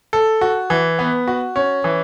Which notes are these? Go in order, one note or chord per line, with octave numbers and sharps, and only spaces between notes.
A4
F#4
E3
B3
F#4
C#4
E3